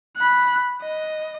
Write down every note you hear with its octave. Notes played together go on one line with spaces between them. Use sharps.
B5 F#6
D#5